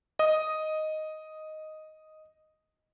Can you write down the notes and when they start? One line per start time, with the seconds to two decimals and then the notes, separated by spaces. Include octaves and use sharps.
0.19 D#5 D#6